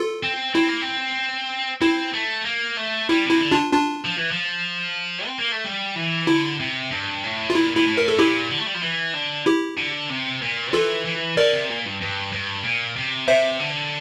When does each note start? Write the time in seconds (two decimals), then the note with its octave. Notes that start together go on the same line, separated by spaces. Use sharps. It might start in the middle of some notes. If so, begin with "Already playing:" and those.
Already playing: F4 A4
0.23 C4
0.54 C4 E4
0.68 A#3
0.81 C4
1.81 C4 E4
2.14 A3
2.45 A#3
2.77 A3
3.09 G3 E4
3.25 C3
3.31 E4
3.41 D3
3.51 D4 F4
3.73 D4 F4
4.05 F3
4.18 E3
4.31 F3
5.26 C4
5.39 A#3
5.52 A3
5.64 G3
5.96 E3
6.27 D3 E4
6.60 C3
6.92 G2
7.24 A2
7.50 F4
7.55 A#2 E4
7.76 A#2 E4
7.87 A2
7.97 A#4
8.08 A4
8.19 A#2 E4 G4
8.51 D3
8.59 A3
8.67 G3
8.75 F3
8.83 E3
9.14 D3
9.46 E4 G4
9.78 D3
10.10 C3
10.42 A#2
10.73 E3 F4 A4
11.05 E3
11.37 D3 A#4 D5
11.53 C3
11.69 A#2
11.85 G2
12.01 G2
12.32 G2
12.64 A#2
12.97 C3
13.28 C3 C5 E5
13.60 D3